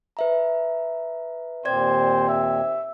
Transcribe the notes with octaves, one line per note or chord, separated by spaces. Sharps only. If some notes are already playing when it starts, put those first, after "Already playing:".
B4 E5 A#5
D#2 A#2 C4 C5 D5 G#6
E5